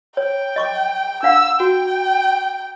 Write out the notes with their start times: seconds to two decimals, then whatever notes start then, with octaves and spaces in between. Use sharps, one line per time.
0.17 C#5 G5
0.56 D#5 C#6 D6
1.23 D4 F5 F#5 E6
1.60 F#4 G5